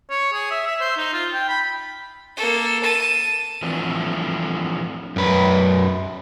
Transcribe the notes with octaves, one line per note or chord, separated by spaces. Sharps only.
C#5
G#4
E5
E5
C5
D#4
F4
G5
B5
A#3 A4
A5 D#7
E3 F3 A3 C4 D4 A4
F#2 B4